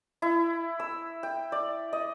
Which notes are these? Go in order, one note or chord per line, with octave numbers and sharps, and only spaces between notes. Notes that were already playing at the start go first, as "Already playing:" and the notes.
E4
E6
G5
D5
D#5